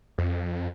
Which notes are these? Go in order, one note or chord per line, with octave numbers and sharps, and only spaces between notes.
F2